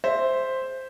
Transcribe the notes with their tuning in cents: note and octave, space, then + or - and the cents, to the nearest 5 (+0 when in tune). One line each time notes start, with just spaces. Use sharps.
G#4 -5 C5 +0 E5 +0